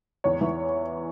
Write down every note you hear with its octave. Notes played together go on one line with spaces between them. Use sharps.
E2 C#5
E3